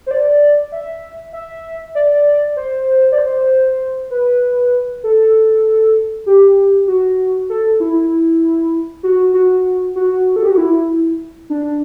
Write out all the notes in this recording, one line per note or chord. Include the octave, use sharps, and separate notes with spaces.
C5
D5
E5
E5
D5
C5
D5
C5
B4
A4
G4
F#4
A4
E4
F#4
F#4
F#4
A4
G4
F#4
E4
D4